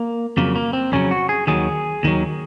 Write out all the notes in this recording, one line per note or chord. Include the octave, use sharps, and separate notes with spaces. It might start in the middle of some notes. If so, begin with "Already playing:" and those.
Already playing: A#3
F2 C#3 F#3 A#3
A#3
C4
F2 C#3 F#3 C#4
F#4
G#4
D#2 D#3 F#3 G#4
D#2 D#3 F#3